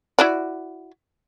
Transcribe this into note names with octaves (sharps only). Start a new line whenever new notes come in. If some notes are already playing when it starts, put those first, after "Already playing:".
E4 F#4 D5